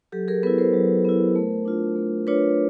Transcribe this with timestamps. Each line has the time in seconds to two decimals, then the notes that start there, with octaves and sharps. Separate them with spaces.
0.12 F#3 G4 A4
0.28 G#4 A#4
0.43 B3 E4 A4 B4
0.58 A#4 C5
0.74 F#3
1.05 B3 E4
1.36 A3
1.65 D4 F4
1.96 A3
2.27 D4 F4 B4 C#5